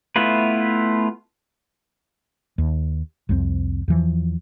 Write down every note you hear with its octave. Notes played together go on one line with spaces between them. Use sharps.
A3 B3 E4 F4 B4
D#2
C2 F2 G#3 C4
E2 E3 F3